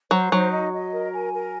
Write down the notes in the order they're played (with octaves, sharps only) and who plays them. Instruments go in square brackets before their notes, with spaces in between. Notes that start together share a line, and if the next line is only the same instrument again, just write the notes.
[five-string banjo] F#3 [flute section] C5
[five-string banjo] F#3 [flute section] D#4
[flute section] D#5
D#5
A#4
G#5
A#4